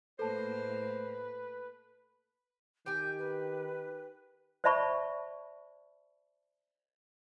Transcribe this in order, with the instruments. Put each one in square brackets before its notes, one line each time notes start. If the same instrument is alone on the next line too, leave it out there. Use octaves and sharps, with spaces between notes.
[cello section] A2 A#3 [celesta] A4 A5 [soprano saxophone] B4 [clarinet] C5
[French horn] D#3 [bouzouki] G4 G5 G#5 [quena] G6
[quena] B4
[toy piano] C5 D5 E5 A5 B5 C#6